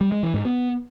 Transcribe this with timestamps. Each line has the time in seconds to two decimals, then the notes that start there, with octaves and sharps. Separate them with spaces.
0.01 G3
0.12 G#3
0.23 E3
0.34 G#2
0.45 B3